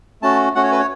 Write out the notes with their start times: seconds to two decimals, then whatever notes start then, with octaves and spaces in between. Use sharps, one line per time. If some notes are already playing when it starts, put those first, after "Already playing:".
0.22 A3 C#4 F#4 A5
0.55 A3 C#4 F#4 F#5
0.63 C#5
0.72 B4
0.79 C#5